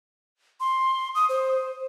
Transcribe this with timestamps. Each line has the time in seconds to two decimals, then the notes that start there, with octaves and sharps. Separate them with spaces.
0.60 C6
1.15 D#6
1.29 C5